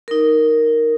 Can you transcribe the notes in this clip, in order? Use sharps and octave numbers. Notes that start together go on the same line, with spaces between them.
D#4 A#4